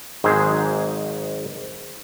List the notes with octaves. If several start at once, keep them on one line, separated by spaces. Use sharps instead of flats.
G#1 G#2 F#3 G#4 C5